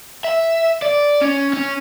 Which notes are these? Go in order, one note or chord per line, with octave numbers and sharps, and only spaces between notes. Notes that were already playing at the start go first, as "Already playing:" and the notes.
E5
D5
C#4
C#4